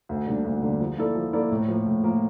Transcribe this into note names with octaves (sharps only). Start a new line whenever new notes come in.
D2
D3 G3 A#3 D4
D2
D3 G3 A#3 D4
F3
A#3 E4 A4 D5
F3
A#3 E4 A4 D5
A2
F3 A#3
A2
F3 A#3